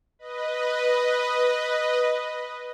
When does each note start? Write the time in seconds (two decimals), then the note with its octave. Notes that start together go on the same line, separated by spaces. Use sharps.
0.19 B4 D#5